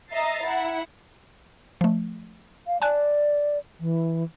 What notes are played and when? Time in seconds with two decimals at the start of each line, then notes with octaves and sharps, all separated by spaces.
0.11 D#5 E5 A#5 A6 C7
0.45 E4 F#5
1.81 F3 A3
2.67 F5
2.82 D5 G#5 A5 F#6
3.80 E3